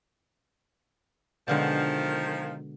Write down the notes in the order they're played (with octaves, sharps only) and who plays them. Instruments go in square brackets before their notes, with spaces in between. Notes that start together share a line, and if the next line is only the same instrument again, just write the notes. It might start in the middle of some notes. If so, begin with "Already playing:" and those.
[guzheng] B2 D3 G#3 [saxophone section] D#3 F3